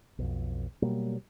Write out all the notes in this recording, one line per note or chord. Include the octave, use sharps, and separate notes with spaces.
B1 F2
B2 F#3 G3 A#3